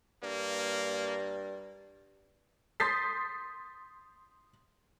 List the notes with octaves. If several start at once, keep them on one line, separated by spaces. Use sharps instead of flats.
G2 A#3
C6 D#6 G6 A6 B6 C7